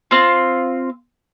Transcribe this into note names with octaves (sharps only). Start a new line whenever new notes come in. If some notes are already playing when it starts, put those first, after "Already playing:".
C4 F4